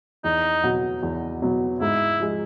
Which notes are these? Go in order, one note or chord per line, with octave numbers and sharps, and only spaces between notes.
E2 D#4
B2 F#3 B3
E2
B2 F#3 B3
G#2 E4
F3 G#3